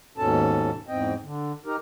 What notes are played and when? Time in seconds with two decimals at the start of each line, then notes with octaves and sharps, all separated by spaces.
0.18 D#2 G#2 B2 C#4 A4 A5
0.88 E2 G#2 C4 D#5 G5
1.23 D3
1.66 D#4 G4 A#4